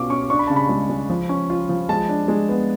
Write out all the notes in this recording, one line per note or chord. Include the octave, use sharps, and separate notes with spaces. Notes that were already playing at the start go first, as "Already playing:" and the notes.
Already playing: B2 C#4 F4 F5 D6
C#4 C#6
D4 C#6
B5
C#3 A5
B5
G#3
G#3
F3
C#4
F4
F3
G#3 A5
D4
G#3
B3